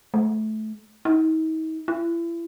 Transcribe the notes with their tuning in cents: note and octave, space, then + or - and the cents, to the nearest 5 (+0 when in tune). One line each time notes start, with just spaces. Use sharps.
A3 -20
D#4 +40
E4 +35